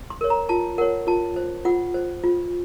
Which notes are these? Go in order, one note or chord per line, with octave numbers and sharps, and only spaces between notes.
C6
A#4 C#5
A#5
F4 A5
A#4 C#5 F#5
F4 A5
C5
F4 F#5
C5
F4